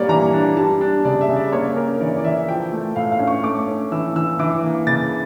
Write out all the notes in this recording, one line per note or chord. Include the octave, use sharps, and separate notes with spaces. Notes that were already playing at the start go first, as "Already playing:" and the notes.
Already playing: A#2 G3 A#3 C#5 D5
E3 A#5
D4
G3 A5
D4
C#3 D5
E5
C#3
D5
A#3 C#5
C#4 A#4
E3 D5
D5
E3 E5
F3 G5
A3
A2 F5
F5
C#4
C#6
A3 D6
C#4
E3 E6
E3 E6
E3 D6
A#3
C#3 A6